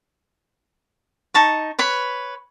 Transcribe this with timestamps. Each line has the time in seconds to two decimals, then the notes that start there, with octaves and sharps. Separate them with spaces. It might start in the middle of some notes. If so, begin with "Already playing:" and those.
1.34 D#4 A5 C#6
1.79 B4 C#5 B5